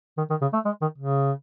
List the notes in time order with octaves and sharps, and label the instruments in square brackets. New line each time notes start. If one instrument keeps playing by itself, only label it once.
[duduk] D#3
D#3
C#3
A3
G#3
D#3
C#3